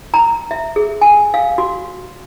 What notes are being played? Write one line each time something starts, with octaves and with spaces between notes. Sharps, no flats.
A#5
E5
G#4
G#5
F5
F#4